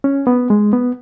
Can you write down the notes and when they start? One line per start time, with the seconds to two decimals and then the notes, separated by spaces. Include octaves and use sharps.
0.04 C#4
0.27 B3
0.50 G#3
0.73 B3